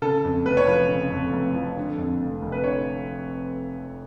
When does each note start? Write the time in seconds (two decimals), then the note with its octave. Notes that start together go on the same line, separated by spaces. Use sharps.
0.02 C#3 A4
0.25 F2
0.46 F1 B4
0.57 C#5
0.67 F3 B4
0.89 C#3
1.12 F2
1.34 F1
1.54 F3
1.77 D3
1.98 F2
2.20 F1
2.42 F1
2.52 B4
2.64 D3 C#5